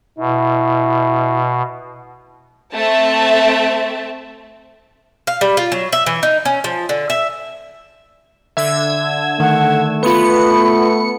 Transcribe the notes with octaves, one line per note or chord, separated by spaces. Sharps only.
B2 E4
A3 C4 E5 A5
F5
G3
F4
F#3
E5
E3
D#4
C#4
F3
D3
E5
D3 E5 E6 G#6
D#3 A3 F#5
B3 F4 B4 B5 C#7